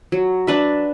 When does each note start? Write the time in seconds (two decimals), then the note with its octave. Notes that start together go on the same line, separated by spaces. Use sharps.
0.12 F#3
0.47 D4 B4 E5